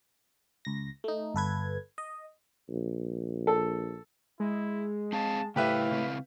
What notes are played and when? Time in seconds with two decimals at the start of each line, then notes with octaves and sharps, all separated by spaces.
0.65 C#2 A#6
1.04 A3 D#4
1.34 G1 A4 B4 G#6
1.98 D#5
2.69 A#1
3.47 A4
4.40 G#3 E4
5.13 C4 G#4 F5 A5
5.56 A2 C#3 E4 G4 B4 E5 F5
5.91 C#3 C4 E4